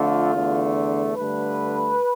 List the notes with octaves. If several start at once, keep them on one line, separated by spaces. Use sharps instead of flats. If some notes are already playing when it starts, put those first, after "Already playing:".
Already playing: F2 D3 A3 F4
E2 D3 A3
G2 D3 A3 B4